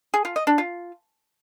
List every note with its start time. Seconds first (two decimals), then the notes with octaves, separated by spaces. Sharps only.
0.14 G#4
0.25 F4
0.36 D#5
0.47 D4
0.58 F4